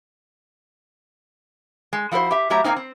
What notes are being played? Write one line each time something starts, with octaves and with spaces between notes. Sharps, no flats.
G#3
F3 E4 F#4 B4 C5
G4 E5
F#3 A3 G4 E5 A#5
A#2 D#3 A#3 C4 D#4
C4